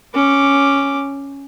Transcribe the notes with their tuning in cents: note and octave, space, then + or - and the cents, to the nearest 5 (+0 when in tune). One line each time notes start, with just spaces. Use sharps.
C#4 +0 D6 +0